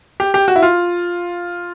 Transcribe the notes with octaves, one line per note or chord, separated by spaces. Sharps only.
G4
G4
F#4
E4
F4